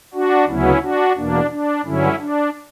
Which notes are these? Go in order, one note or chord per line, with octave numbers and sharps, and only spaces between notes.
D4 F#4
D2 C#3 F#3 B3 C#4 E4
D4 F#4
E2 B2 A#3 D4
D4
G2 D3 F#3 C#4 E4
D4